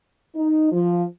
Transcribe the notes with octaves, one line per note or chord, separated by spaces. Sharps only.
D#4
F3